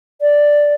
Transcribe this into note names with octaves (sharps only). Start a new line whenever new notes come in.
D5